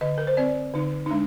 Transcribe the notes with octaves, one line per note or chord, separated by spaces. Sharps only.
D3 D#5
A#4
C5
C4 D5
D3 D#4
D#4
G#3 D4